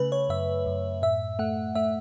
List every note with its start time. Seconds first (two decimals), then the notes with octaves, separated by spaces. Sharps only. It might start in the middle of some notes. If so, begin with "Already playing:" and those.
Already playing: C#3 A3 B4
0.12 C#5
0.29 F#2 E5
0.66 F#2
1.02 A2 E5
1.39 A3 F#5
1.75 A3 E5